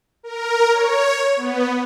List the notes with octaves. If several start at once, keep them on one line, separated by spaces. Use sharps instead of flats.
A#4
C#5
B3